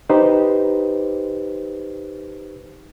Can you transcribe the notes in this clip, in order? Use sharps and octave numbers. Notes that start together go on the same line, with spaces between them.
D#4 G4 B4 C5